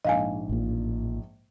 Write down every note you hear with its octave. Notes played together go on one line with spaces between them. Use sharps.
A#1 G#2 D#5 F5 G#5
A1 A#2